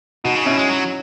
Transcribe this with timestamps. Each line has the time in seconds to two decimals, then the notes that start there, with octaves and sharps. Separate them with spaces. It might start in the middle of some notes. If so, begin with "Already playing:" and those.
0.24 B2 D#4 F#4
0.35 C#3
0.46 B2 C#4 E4
0.57 G#3
0.68 F#3